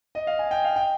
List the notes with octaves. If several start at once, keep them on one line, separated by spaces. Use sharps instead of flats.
D#5
F5
G#5
G5
F5
G5